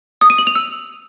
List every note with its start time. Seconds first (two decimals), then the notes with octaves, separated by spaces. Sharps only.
0.21 D#6
0.30 D#7
0.38 F#7
0.47 F7
0.55 E6